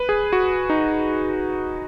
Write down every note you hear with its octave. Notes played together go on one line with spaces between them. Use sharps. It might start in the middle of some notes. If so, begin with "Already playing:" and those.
Already playing: B4
G#4
F#4
D#4